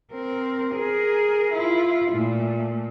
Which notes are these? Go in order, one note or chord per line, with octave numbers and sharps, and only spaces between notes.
C4 A#4
G#4 A#4
E4 F4
A#2 A3